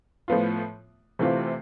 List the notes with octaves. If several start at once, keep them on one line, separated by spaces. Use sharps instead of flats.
A2 F3 B3 F4
C3 E3 A3 C4 F4